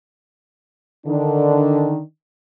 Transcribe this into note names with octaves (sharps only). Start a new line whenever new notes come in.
D3 D#3 D4